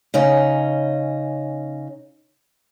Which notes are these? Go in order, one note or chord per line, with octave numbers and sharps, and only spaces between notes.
C#3 C#4 D#4